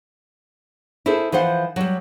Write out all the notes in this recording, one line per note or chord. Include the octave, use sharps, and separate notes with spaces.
E4 G#4 A4 C5
E3 F3 C5 F#5
F#3 G3